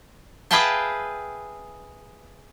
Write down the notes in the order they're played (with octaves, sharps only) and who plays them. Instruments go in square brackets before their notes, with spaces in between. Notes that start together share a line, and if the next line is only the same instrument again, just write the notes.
[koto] G#4 B4 E5 F5 G5 A5